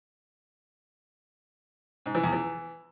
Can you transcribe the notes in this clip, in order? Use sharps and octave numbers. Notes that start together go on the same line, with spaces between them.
G#2
E3
E2
E3